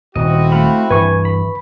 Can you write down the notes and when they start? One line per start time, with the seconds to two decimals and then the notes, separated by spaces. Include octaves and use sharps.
0.16 D#1 C4 E4 F#4 D#5
0.52 A3 F5 B5
0.91 G2 E3 B4 G#5 C#6
1.25 B5